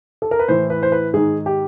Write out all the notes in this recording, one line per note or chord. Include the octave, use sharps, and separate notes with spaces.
A4
A#4
B4
A2 E3 C5
B4
C5
B4
G#2 D#3 G#4
G4